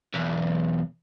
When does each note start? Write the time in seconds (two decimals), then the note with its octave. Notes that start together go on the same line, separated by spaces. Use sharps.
0.14 B1 E2